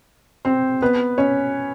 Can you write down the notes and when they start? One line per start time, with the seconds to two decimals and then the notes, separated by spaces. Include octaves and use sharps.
0.45 C4 C5
0.82 B3 B4
1.18 C#4 C#5